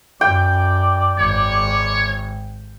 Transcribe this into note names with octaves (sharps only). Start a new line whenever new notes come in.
F#2 D5 G5
G#1 C#5